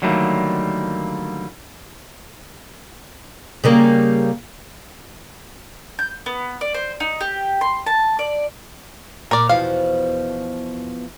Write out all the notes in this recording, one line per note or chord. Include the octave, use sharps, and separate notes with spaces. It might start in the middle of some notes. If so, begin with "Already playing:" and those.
D3 D#3 F#3 G3 A3 A#3
C#3 G3 A#3
G6
B3
D5
C5
D#4
G4
C6
A5
D5
A#2 A#4 D5
E2 B2 F3 F5